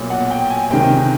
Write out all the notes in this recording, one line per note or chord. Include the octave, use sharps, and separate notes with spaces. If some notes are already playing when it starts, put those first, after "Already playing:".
Already playing: B1 A#2
F#5
G5
G#5
C#2 C3 D#3 G5